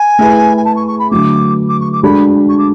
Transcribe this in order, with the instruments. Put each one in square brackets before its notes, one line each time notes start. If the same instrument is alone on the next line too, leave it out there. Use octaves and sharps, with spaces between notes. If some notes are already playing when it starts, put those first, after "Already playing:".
Already playing: [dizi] G#5
[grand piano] A3 E4 G#4 B4
[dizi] G#5
A5
C#6
C#6
B5
[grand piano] D3 F#3 A3 [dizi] D6
[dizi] D6
C#6
D6
[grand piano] G#3 D4 F#4 A4 [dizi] B5
[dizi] C#6
D6